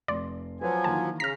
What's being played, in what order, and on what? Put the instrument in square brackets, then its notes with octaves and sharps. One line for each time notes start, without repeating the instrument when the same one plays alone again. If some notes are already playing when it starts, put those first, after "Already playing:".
[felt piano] F1 C6 [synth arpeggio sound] D5
[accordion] F3 F#3 [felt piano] B4 [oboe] G#5
[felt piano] D#3 E3 A#3 [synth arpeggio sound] A5
[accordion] C#3 [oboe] A#5 [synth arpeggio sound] F6 B6